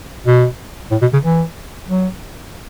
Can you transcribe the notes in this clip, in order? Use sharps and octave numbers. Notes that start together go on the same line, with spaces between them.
B2
A2
B2
C#3
E3
F#3